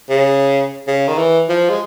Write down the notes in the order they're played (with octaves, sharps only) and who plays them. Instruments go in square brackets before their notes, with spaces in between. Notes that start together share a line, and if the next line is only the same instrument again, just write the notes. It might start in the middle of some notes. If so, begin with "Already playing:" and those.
[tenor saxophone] C#3
C#3
D#3
E3
F3
G#3